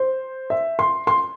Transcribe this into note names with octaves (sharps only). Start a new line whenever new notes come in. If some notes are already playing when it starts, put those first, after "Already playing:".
Already playing: C5
E5
C6
C6